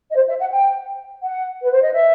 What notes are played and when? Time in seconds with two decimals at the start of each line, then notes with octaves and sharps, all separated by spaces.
0.11 D#5
0.16 C5
0.28 E5
0.39 F#5
0.52 G5
1.23 F#5
1.62 B4
1.71 C5
1.82 D#5
1.93 E5